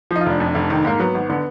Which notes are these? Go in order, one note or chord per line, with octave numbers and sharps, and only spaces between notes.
F3
D#4
F4
F1 D4
F2 D4
F1
D#3
G#2 A#3
F#3 B3
G#1
D3 B3